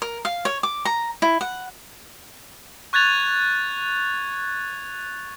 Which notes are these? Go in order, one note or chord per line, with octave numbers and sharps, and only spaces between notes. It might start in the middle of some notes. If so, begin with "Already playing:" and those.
A#4
F5
C#5
D6
A#5
E4
F#5
C#6 F#6 G#6 A6 F7